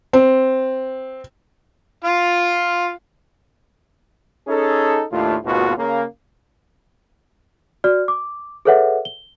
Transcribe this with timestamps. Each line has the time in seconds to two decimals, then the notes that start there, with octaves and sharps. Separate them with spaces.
0.13 C4
2.04 F4 F5
4.48 C#4 D#4 G#4 A4
5.12 D#2 A2 A3 D4 F4
5.45 G#1 D#2 B2 B3 F4 F#4
5.77 C#3 A#3
7.84 F#4 D5 F6
8.08 D6
8.65 G#4 A4 B4 C#5 E5 F#5
9.05 G7